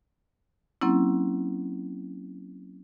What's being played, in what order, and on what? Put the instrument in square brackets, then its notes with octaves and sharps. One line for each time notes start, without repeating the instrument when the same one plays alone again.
[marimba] F#3 A#3 C4 C#4 E4